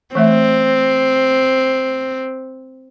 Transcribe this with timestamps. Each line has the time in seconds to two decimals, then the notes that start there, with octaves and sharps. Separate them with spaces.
0.15 E3 A3 C4 E5